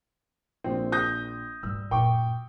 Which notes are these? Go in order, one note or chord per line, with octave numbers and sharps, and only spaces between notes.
A#1 C4
D#6 G6 A#6
G#2 G3 E6
F#2 A#2 G5 C#6 D6